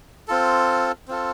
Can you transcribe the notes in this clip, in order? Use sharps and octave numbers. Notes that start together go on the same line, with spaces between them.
C4 F4 A4
C4 F4 A4